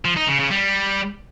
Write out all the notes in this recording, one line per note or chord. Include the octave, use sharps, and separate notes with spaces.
F3
D#4
C#3
C#3
G3